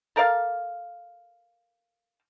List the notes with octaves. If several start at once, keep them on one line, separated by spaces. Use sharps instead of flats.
A4 A#4 D5 F5